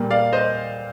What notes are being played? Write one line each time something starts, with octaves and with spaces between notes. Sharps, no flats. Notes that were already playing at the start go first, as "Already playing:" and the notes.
Already playing: A#2 G3 A#3
D5 F5
C5 D#5